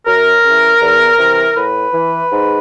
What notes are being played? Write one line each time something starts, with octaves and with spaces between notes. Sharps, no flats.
F#2 A#4
C#3 E3
E2
C3 E3
A2 B4
E3
G#2